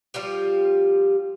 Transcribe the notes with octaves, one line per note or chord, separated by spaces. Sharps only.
F3 G3 F4 G4